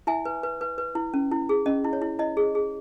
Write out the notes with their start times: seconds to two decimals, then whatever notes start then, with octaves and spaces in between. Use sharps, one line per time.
0.07 E4 E5 G#5
0.25 B4
0.43 B4
0.61 B4
0.78 B4
0.95 E4
1.14 C#4
1.31 E4
1.49 G#4
1.66 C#4 D#5
1.84 E4
1.93 C#5
2.02 E4
2.19 E4 D#5
2.37 G#4
2.55 G#4